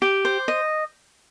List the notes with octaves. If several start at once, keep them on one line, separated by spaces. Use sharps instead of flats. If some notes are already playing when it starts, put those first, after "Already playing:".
G4
C5
D#5